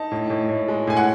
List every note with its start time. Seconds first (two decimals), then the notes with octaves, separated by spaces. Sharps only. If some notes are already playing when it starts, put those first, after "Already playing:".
Already playing: D#4 A5
0.11 A2
0.30 A2
0.49 A2
0.68 G#3
0.87 A2 G#5
0.97 F#5